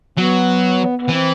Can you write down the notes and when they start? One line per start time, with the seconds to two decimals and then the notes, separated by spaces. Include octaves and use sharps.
0.17 F#3 B3
0.99 B3
1.09 E3 C4